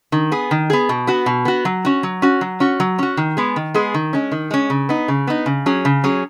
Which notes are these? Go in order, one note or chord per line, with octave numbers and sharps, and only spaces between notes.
D#3
B3 G#4
D#3
B3 G#4
B2
B3 F#4
B2
B3 F#4
F#3
C#4 F#4
F#3
C#4 F#4
F#3
C#4 F#4
F#3
C#4 F#4
D#3
G#3 B3 G#4
D#3
G#3 B3 G#4
D#3
G#3 C#4
D#3
G#3 C#4
C#3
B3 D#4
C#3
B3 D#4
C#3
F#3 C#4 G#4
C#3
F#3 C#4 G#4